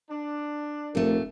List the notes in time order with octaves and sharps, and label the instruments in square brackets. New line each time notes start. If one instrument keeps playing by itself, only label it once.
[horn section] D4
[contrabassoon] F1 [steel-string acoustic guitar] A#2 A3 [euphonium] A#4